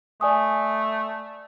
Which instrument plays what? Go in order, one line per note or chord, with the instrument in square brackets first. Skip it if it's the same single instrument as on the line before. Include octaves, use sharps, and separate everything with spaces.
[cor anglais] A3 [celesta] D5 G#5 D#6